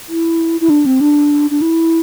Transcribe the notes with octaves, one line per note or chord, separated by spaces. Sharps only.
E4
E4
D4
C4
D4
D4
E4